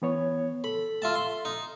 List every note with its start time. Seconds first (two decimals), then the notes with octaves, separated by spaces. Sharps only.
0.02 E3 B3 C#5
0.64 A4 B5
1.02 F4 E5 A5
1.15 C6
1.45 D#4